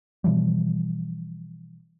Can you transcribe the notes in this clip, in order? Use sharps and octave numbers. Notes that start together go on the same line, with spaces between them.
B2 E3 F3 G3